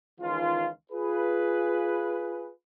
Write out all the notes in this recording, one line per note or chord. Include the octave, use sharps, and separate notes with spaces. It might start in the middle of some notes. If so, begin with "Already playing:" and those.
C#2 D#3 E3 F4
F4 G#4 B4